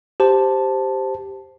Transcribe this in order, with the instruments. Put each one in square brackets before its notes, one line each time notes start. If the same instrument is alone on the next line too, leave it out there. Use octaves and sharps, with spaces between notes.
[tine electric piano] G4 C5 A5